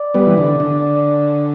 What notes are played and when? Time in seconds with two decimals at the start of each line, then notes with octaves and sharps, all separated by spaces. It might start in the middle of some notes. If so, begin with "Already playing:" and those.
Already playing: D5
0.14 G3 B3
0.27 E3
0.38 D3
0.60 D3